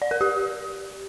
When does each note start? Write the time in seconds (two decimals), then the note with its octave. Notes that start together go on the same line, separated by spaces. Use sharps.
0.02 D5
0.11 A#4
0.21 G4